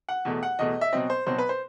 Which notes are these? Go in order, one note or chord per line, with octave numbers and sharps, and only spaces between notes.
F#5
E2 B2 A3
F#5
E2 B2 A3 D#5
E5
B2 F#3 C4 D#5
C5
B2 F#3 C4 C5
B4
C5